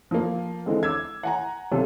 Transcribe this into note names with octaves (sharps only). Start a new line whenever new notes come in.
F3 A#3
D3 E3 G#3 C4
D6 E6 G#6
F#5 G#5 A#5
B1 C3 A4